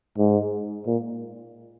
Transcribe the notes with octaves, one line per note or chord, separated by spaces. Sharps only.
G#2
A#2